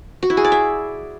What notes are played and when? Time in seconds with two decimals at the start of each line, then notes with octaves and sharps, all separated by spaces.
0.23 F#4
0.30 E4
0.37 G#4
0.44 D5
0.52 E5